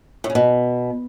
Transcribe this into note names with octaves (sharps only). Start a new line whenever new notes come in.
A2
C#3
B2